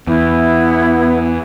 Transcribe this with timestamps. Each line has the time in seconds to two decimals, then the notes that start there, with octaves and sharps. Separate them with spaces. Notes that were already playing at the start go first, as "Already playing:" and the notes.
0.07 E2 B3 E4